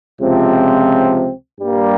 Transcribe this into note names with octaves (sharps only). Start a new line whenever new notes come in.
C#2 C3 F3 C4
G2 G3 A#3